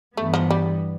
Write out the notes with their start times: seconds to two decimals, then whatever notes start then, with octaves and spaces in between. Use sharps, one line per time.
0.17 G2 E3 A3 B3
0.34 F3
0.50 G3